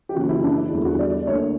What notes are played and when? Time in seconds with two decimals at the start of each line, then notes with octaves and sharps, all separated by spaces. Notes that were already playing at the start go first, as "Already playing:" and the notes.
0.09 G4
0.15 F#2 C#3 E3 A#3 F#4
0.29 E4
0.44 D4
0.57 E4
0.71 E2 D3 G3 E4
0.85 F#4
0.99 D5
1.13 D5
1.27 D2 D3 A#3 C#5